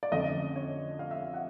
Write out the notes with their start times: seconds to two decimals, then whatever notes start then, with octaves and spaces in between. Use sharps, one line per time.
0.03 D5
0.12 F2 D3 F3 A3 C#4 D#5
0.56 C#5
0.99 F5
1.11 E5
1.22 F5
1.34 F#5